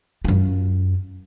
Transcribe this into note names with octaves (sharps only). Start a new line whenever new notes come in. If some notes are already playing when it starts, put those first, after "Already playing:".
F#2 F4